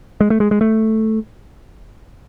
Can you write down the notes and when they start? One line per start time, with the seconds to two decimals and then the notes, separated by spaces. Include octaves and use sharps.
0.21 G#3
0.30 A3
0.40 G#3
0.51 G#3
0.61 A3